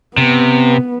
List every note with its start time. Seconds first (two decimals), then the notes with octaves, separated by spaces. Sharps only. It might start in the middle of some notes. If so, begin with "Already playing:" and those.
0.17 C3 B3